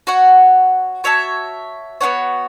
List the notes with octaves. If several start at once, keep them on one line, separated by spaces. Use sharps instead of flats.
F#4 C#5 F#5
F#4 C#5 E5 A5
B3 D4 F#4 C#5